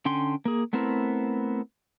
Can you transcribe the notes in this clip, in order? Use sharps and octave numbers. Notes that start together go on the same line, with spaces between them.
D3 C#4 G5 C6
A#3 G#4
A3 B3 C4 E4 A#4